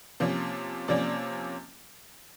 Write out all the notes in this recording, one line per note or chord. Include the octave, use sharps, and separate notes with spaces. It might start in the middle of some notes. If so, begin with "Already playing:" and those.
C3 F3 A#3 C#4
C3 F3 A#3 C#4 D5